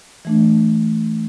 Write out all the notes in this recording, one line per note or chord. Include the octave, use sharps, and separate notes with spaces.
E3 A3 D4